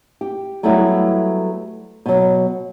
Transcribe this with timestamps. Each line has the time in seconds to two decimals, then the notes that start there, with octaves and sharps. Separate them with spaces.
0.21 G4
0.63 F#3 G3 A3 B3 E4
2.06 B2 F#3